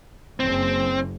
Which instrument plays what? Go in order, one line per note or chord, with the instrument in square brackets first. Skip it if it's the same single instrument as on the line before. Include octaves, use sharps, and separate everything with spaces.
[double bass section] F#1 [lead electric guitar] C4